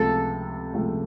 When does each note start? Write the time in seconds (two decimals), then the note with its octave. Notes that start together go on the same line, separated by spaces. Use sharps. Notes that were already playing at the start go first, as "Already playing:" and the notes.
Already playing: C#2 C3 F3 A3 A4
0.74 C#2 C3 F3 A3